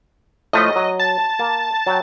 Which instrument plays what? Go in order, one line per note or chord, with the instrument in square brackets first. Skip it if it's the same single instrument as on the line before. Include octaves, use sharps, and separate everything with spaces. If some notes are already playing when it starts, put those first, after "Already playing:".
[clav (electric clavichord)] A2 F3 A3 [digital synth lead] D#5
[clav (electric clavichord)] F#3
[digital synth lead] A5
[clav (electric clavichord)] A#3
F#3 G5